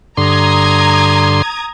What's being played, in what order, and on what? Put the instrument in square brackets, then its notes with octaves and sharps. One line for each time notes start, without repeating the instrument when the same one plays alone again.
[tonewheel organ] G2 D3 C6 [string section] A#5 D#6 G#6